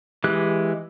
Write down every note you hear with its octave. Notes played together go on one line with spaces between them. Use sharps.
E3 G#3 G4 F#6